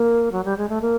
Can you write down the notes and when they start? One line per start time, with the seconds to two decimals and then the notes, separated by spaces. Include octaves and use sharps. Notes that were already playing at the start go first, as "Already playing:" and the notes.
Already playing: A#3
0.32 F#3
0.45 G3
0.57 G#3
0.69 A3
0.82 A#3